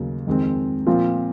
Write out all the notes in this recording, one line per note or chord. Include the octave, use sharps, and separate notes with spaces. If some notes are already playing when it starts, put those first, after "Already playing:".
Already playing: D#2 C#3 F#3
F2 D#3 G#3 C4
A#2 F3 C4 F4